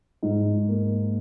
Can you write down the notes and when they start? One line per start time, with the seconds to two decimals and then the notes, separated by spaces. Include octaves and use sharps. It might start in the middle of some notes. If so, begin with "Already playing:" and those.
0.23 G#2
0.69 A#3